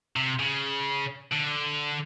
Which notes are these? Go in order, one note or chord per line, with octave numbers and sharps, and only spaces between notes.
C3
C#3
D3